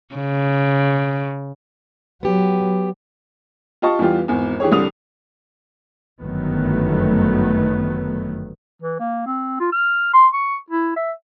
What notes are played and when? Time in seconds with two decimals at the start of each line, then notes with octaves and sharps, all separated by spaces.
0.15 C#3
2.23 F#3 B3 G4
3.82 F4 G4 D#5 A5 C#6
3.99 E2 E3 G3 B3 F4 G4
4.28 G#1 E2
4.60 E3 G4 G#4 C#5
4.72 C2 D3 G3 D#6 F7
6.22 G1 F#2 D#3 F#3 A3 B3
8.82 E3
8.99 A#3
9.27 C4
9.60 F4
9.72 F6
10.13 C6
10.33 C#6
10.70 E4
10.96 E5